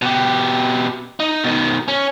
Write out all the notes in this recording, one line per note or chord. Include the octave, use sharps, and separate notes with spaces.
B2 G4
D#4
B2 D#3
C#4